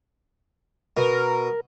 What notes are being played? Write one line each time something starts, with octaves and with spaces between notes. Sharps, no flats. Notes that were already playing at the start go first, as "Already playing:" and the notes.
B2 A#4